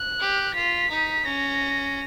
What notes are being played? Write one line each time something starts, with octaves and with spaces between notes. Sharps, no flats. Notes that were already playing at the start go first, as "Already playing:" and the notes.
Already playing: F#6
G4
F4 B6
D#4
C#4 A#6